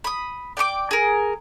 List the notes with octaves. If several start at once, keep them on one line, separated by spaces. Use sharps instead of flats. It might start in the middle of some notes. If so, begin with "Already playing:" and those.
B5 D#6
D5 G5 C#6 D6
G#4 A#4